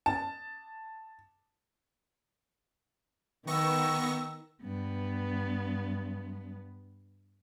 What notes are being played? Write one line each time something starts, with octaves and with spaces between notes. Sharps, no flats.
A5
D#3 B3 G5 C#6 E6 A#6
G2 B3